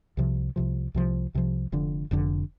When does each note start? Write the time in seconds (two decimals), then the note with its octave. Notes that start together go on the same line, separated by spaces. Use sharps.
0.17 C2 C3 F3
0.56 C2 C3 F3
0.94 C2 C3 F3
1.34 C2 C3 F3
1.72 F1 F2 D3
2.11 F1 F2 D3